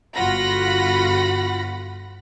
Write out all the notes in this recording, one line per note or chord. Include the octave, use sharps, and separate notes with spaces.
G1 F4 F#4 F#5 B5 A#6